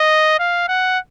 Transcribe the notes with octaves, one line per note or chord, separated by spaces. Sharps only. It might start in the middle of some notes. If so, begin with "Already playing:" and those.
Already playing: D#5
F5
F#5